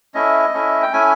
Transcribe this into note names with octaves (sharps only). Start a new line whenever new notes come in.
A3 C#4 E4 D#5
A3 C#4 E4
G5
A3 C#4 E4 G#5